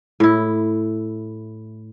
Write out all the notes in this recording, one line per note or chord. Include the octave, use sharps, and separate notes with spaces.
A2 E4